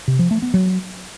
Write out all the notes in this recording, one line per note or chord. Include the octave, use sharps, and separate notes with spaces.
C3
F3
A3
B3
F#3